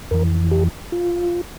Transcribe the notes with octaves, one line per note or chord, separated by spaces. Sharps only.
F2 E3 A#4
G4
F4